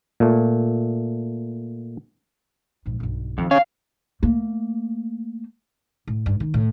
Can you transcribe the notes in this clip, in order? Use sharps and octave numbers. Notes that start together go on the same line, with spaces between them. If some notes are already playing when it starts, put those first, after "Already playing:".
A#2 A3
A#1 G#2
B1 G2
F2 D#3
C#4 F5
A3 A#3
A2
G2
D#3
A2